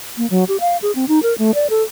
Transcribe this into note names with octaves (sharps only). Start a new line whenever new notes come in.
A#3
F#3
G4
F5
G#4
C4
D#4
A#4
A3
D5
A4